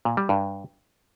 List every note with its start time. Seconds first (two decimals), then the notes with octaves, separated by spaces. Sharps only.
0.05 A#2
0.17 G3
0.29 G2